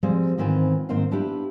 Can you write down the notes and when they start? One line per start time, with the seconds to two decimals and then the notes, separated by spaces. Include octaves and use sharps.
0.03 F3 G3 G#3 C4
0.38 G#2 D#3 E3 C4 C#4 F4
0.89 G#2 D#3 A#3 C4 C5 F5
1.11 B3 D4 E4 F4 G4